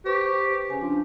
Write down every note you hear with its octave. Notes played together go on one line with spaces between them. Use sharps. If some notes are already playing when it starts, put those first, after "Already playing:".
G4 B4 C5 C#6
C#3 C#4 G#5
F3 D4